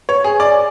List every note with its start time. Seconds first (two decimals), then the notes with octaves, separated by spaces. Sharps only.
0.09 C#5
0.24 G#4
0.40 D5